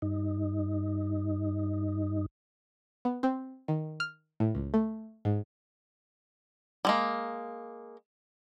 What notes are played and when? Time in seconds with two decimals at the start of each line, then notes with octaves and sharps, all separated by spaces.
0.02 G2 D#4
3.05 B3
3.23 C4
3.68 D#3
4.00 F6
4.40 A2
4.55 C#2
4.74 A3
5.25 G#2
6.85 G3 G#3 A#3